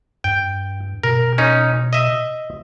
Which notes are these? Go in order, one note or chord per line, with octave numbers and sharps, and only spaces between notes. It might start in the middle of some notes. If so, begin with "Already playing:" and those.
G2 G5
B2 A#4
C#4 D#4
D#5 E5